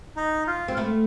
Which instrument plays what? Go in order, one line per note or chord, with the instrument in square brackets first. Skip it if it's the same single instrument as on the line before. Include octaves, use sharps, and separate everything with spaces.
[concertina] D#4
F4
[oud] C4
A3 B3